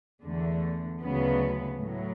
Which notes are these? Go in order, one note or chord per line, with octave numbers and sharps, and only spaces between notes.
E2 D3 A3
D2 C#3 F#3 B3
A2 F#3